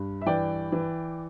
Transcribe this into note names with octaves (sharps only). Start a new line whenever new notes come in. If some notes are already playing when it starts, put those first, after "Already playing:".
Already playing: G2
E5
E3 D5 G5
E3